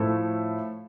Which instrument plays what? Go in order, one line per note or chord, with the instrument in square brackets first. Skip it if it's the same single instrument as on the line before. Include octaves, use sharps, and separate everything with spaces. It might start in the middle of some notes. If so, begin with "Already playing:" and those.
Already playing: [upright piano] A2 F3 A3 E4 A4